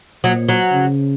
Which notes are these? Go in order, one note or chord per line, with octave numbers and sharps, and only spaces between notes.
A#2 F#3
F#3
C#3